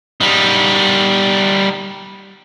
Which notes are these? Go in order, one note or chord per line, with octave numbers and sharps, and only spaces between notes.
G3 D#4